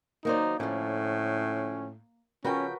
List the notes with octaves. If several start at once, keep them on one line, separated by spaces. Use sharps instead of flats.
D#3 F#3 A#3 D#4 C5 D5
A2 D3 F3 C#4
C#3 F3 C#4 F#4 A#4 B4 G5